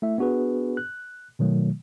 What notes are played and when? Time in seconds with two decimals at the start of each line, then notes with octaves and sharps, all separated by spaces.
0.02 A3 E4 E5
0.18 B3 D4 F#4 G#4 B4
0.77 F#6
1.39 B2 D#3 F#3 A3